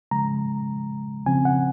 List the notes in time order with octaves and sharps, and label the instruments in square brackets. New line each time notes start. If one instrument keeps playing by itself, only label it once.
[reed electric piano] C#3 F3 G#3 A#5
C#3 F3 C4 G#5
F#5